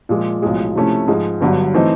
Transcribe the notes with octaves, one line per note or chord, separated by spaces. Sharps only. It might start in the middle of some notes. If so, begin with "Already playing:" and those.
A#2 F3 G#3
B1 A2 F3 G#3
C3 F3 A3 C#4 E4
G#2 F3 G#3
G1 G2 D3 F#3
E3 A3 C4 D#4